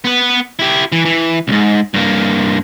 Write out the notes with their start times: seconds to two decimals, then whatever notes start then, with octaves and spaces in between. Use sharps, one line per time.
0.04 B3 B4
0.59 E4 G4
0.92 E3
1.05 E3
1.48 C2 G#2
1.94 G2 A#3